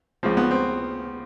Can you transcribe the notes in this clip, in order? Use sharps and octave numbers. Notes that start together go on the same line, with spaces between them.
C#2 C#3 F3 C4
B3
C4